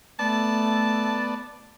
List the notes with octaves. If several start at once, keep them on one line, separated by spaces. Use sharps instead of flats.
A3 B3 D5 A5